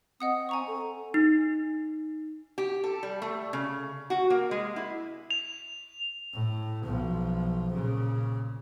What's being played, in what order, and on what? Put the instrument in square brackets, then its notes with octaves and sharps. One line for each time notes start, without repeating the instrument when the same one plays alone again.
[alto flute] C4 [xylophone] D#5 F#5 D#6
[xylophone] G#5 A#5 C#6
[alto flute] A4
[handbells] D#4
[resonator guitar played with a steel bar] G4
A4
G3
A3
C#3
F#4
A#3
G#3
E4
[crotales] F7
[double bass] A2
B1 F3
A#2 C#3